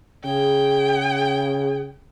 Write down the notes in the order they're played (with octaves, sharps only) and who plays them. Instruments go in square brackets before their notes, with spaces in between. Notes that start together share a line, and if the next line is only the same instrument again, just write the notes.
[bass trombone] C#3 [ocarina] G#4 [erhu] G5